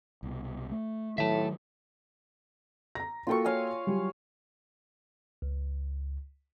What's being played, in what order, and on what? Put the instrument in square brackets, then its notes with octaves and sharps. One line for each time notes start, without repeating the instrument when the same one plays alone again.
[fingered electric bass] C2 B2
A3
[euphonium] A2 [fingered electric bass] D#3 F#3 [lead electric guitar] E5 A5
[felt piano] A#5 A#6
[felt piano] A#3 F#4 A4 [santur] F4 G5 C#6
[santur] C#5 F5 G#5
[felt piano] F#3 G3
[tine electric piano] C#2